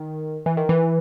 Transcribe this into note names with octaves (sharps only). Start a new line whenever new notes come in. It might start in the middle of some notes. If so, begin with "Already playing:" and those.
Already playing: D#3
E3
D#3
E3